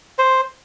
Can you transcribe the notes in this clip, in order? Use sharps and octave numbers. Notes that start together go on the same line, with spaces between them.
C5